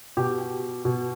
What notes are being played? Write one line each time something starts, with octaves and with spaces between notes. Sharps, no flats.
B2 G4
B2